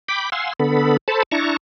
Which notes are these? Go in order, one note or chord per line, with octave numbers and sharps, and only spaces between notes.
G5 B5 D6
F5 F#5 G#5 C6 E6
D3 B3 A4 B5
A4 C5 A5 B5
D4 E4 A5 A#5 C#6